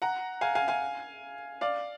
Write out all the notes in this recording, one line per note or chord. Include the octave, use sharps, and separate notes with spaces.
F#5 A#5
F5 G#5
F5 G#5
F5 G#5
D5 F5